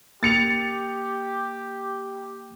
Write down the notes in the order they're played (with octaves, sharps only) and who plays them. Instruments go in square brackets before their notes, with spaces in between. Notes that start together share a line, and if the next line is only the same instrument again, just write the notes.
[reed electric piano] A#3 [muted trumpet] G4 [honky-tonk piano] A6 C#7 F7